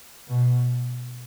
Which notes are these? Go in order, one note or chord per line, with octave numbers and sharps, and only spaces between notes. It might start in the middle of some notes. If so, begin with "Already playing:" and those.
B2